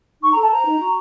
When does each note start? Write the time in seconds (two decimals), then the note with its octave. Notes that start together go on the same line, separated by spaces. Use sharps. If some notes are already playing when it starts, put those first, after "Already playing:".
0.21 D#4 C#6
0.31 A#5
0.35 A4
0.41 A5
0.50 C5 A#5
0.65 D#4
0.81 F#4